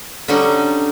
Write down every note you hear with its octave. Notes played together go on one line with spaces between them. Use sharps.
D3 F#3 G3 C#4 D#4